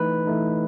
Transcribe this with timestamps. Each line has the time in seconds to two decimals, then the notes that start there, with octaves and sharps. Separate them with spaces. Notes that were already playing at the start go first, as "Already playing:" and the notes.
Already playing: E3 A3 D#4 B4
0.27 E3 A3 D#4